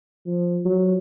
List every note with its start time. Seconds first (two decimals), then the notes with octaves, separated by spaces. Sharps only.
0.26 F3
0.65 F#3